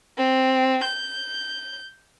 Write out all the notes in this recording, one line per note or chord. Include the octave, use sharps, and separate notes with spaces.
C4
G6